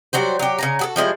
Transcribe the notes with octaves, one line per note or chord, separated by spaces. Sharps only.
F#3 G3 F#4 C5
F#3 G4
C#3 G#5 A#5
F#4 G#4 A4
F3 G3 G#3 E4